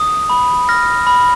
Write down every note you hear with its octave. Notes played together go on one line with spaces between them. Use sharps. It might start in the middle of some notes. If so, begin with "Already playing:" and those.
Already playing: D#6
B5
F6 A#6
B5